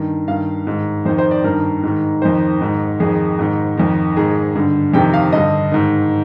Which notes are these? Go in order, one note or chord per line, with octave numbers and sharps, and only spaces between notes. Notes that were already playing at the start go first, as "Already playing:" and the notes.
Already playing: G2 D#3
G2 D#3 F5
G#2 D#3
F2 D#3 C5
C5
D5
G2 D#3 A#4
G#2 D#3
F2 D#3 C5
G#2 D#3
F2 D#3 G#4
G#2 D#3
F2 D#3
G#2 D#3 G#4
G2 D3
F2 C3 D#3 G5
F5
G2 D3 D#5
G#2 D#3